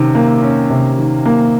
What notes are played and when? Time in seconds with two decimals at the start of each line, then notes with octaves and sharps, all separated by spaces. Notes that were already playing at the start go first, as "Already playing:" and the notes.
Already playing: C3 D#3 C#4
0.15 A#3
0.42 C#4
0.70 C3
0.98 D#3
1.25 A#3